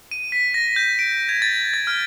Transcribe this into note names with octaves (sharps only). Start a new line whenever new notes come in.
D#7
B6
A#6
G6
D7
G#6
A6
A6
F6